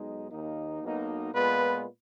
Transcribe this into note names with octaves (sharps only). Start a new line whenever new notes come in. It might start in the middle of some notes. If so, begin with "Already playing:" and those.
Already playing: B1 B2 G#3 D#4
D#2 D#3 A#3 D#4
B1 B2 A#3 D#4
A#2 G#3 B3 F4 B4